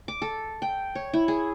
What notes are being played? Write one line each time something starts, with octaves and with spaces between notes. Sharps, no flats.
D6
A4
G5
C#5
E4
G#4